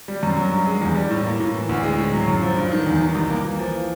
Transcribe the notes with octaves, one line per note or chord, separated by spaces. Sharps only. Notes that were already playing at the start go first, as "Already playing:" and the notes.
G3
F#2
F#3
G2
G#3
E2
G3
A2
A#3
A2
E3
D2
G#3
A2
F#3
F#2
F3
G2
D#3
E2
D#3
C2
A#3
E3
F3